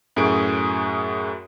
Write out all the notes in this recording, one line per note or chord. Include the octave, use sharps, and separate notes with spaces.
F#2 A2 F#4 G#4 D7